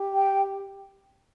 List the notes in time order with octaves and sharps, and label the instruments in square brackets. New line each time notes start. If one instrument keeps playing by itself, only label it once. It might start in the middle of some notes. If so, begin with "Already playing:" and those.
Already playing: [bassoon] G4
[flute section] G5